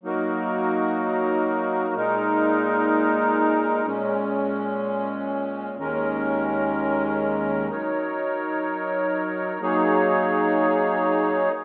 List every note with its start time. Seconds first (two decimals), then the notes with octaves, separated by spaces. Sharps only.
0.03 F#3 A#3 D#4 F#4 A#4
1.95 A#2 G#3 D#4 A#4
3.86 A#2 G#3 C#4
5.78 D#2 D#3 G#3 C#4 A#4
7.70 F#3 D#4 A#4 C#5
9.61 F#3 A#3 D#4 G#4 C#5